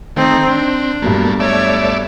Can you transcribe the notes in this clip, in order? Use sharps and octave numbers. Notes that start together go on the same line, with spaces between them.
D#3 A3 C4 D#4
C4 D4
G2 B2 F#3 A3 A#3
A3 C#5 D5 E5